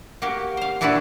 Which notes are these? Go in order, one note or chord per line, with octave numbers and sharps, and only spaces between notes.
A#3 F#4 G4
C5 F5
A#2 D4 E4 F#4 B4 F#5